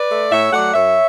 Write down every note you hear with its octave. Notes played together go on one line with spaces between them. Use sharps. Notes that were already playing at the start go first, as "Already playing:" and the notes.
Already playing: B4 D5
A3
A2 C#5 E5
F#3 A3 D5 F#5
F#2 C#5 E5